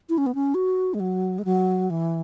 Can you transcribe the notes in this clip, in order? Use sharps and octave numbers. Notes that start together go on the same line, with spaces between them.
E4
C#4
B3
C#4
F#4
G#3
F#3
G#3
F#3
E3